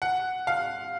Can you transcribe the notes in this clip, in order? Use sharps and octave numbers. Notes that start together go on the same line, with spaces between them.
F#5
F5